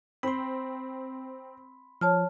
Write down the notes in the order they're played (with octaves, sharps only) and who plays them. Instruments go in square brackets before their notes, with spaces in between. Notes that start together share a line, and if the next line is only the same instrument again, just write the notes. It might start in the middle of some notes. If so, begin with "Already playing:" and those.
[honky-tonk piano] C4 [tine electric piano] B5 C6
[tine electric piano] F3 [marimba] C#5 A5 F6